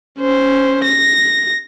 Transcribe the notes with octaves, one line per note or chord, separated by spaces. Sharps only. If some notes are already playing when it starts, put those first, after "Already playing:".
C#4 C5
A#6